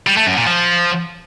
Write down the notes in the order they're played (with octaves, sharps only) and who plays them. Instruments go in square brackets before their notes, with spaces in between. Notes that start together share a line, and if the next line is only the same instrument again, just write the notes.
[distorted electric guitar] G3
A3
F#2
A#2
F3